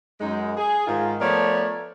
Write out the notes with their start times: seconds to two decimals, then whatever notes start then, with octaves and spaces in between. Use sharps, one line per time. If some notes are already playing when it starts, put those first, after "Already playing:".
0.21 F#2 G#3 D#4
0.57 G#4
0.87 G#2 D#3 F4
1.20 F3 A3 B3 A#4 C#5 D5